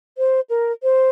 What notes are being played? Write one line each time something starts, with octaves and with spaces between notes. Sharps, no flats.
C5
A#4
C5